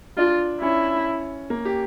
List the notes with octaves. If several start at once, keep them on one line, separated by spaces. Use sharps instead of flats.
D4 F4
C#4 E4
A#3
G4